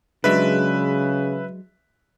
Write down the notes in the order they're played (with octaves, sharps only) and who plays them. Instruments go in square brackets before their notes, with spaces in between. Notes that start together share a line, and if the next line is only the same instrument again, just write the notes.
[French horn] C#3 [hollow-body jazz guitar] F#3 G#3 D4 [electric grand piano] B4 E5 B6